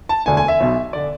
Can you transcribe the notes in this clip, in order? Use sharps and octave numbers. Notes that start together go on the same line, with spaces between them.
A5
E1 D2 D3 G#5
G#5
E5
B1 B2
D3 D5